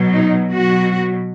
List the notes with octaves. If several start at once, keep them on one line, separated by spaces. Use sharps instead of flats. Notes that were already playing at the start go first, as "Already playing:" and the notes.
Already playing: B2 F#3
D#4
B2 F#3 F#4